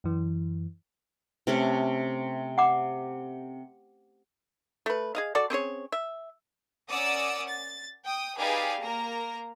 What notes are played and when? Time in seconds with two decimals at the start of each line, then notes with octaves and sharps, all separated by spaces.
0.04 F#2 E3
1.47 C3 A3 C#4
2.58 F#5 D6
4.86 A3 B4
5.15 G#4 D#5 F5
5.35 F#4 A4 D5
5.50 C4 C#4 G#4 C#5
5.92 E5
6.89 C#4 A#4 D5 F#5 D#6 E6
7.47 A6
8.05 G5 D#6
8.37 D#4 G4 G#4 B4 D5 F5
8.81 A#3 A#4 A#5